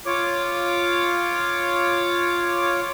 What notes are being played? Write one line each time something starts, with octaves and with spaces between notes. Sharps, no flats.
F4 C#5 D6